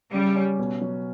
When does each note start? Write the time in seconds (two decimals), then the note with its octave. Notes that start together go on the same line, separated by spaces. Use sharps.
0.14 C#3 G3
0.35 C#4
0.59 B2
0.81 F#3